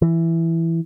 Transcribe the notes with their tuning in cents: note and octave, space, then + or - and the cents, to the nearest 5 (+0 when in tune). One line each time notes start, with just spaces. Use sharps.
E3 +5